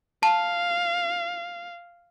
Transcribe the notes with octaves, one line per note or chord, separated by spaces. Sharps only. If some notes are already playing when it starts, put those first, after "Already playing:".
F5 A5